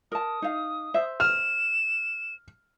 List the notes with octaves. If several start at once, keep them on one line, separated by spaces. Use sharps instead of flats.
A#4 A5 D#6
D#4 F5
C5 E5
F6 E7